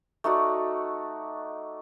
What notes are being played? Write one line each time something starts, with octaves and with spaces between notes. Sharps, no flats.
A3 D#4 F#4 D5